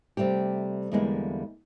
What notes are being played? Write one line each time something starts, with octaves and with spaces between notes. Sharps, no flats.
C3 G3 A3 G4
E2 D3 G3 G#3 A#3 E4